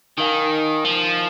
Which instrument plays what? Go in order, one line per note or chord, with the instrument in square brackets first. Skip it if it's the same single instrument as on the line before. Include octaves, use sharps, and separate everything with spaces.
[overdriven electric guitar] D#3 [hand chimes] D#4 A#4 F5 G#5
[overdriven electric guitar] F3